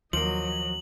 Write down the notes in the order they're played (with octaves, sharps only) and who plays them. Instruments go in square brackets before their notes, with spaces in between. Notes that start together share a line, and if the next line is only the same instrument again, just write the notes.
[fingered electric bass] D#2 [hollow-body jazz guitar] F3 A#3 [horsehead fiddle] F#3 D#5 [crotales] F#7